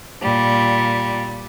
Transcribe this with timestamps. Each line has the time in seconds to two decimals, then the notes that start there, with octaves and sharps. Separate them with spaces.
0.21 A#2 G3